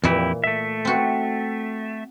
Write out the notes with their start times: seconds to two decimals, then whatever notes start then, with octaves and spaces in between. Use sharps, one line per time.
0.04 F2 A#2 E3 E4 G4
0.44 A3 E5
0.85 C4 F#4